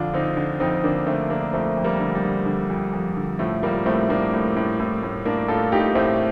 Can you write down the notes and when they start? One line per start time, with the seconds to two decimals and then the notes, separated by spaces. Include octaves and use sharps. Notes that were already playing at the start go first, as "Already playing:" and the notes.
Already playing: F2 D3 D4 F4
0.13 D3 C4 D#4
0.37 D3
0.60 F2 C4 D#4
0.84 D3 A#3 D4
1.07 D3 A3 C4
1.30 D3 A#3 D4
1.53 F2 A3 C4
1.77 F2
1.84 G3 A#3
2.00 D3
2.15 G3
2.24 D3
2.46 D3
2.70 F2
2.93 F2
3.17 D3
3.39 A2 F3 A3
3.63 A2 G3 A#3
3.86 A2 A3 C4
4.09 A2 A#3 D4
4.33 A2
4.56 A2
4.79 A2
5.03 A2
5.25 A2 A#3 D4
5.48 A2 F4 A4
5.72 A2 D#4 G4
5.95 A2 A3 C4